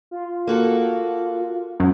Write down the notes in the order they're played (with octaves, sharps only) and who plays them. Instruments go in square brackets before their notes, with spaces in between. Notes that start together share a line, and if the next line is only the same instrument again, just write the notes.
[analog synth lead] F4
[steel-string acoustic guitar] A#3 F#4 A4
[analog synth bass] F#2